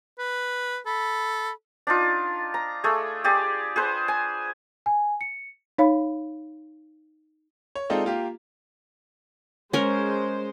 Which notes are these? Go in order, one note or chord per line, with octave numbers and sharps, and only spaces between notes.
B4
A4 B5
D4 D#4 F4
A#5
A3 G#4
G4 G#4 D5
G#4 B4 C5
G#5
G#5
C#7
D#4 C#5 F5 B5
C#5
G#3 C4 D#4 F4 A4 D5
A#3 F4 G4
G#3 C#4 A#4 C5